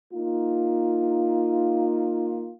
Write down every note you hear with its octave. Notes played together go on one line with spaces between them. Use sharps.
A#3 D#4 F4